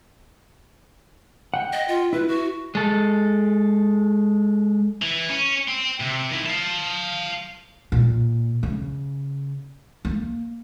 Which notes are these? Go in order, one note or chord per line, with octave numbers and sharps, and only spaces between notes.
F#5 G5
D#5
F4
E4 B4
F#4
G#3 A4
E3
C#4
G5 C6
C3
D#3 E4
F5 A5
A#2
C#3
A#3